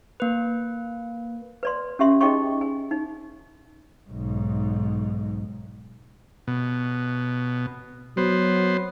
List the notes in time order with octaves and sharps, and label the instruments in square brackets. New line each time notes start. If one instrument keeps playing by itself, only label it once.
[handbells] A#3 B4
[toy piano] B4 D5 C6
C#4 G4 E5 C6
D#4 G#4 D#5 G5 C6 C#6
G#5
D#4
[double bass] B1 G#2
[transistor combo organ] B2
[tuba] F#3 [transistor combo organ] B3 C5